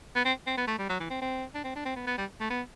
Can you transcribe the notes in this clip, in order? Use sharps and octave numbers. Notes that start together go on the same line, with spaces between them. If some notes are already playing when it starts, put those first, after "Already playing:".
B3
C4
C4
B3
A3
G3
F#3
E3
C4
C4
D4
C4
D4
C4
B3
B3
G3
A3
B3